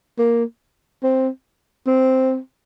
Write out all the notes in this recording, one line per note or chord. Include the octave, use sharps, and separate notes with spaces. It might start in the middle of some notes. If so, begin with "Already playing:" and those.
A#3
C4
C4